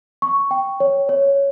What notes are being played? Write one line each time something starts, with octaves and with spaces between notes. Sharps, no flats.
C#6
G5
C#5
C#5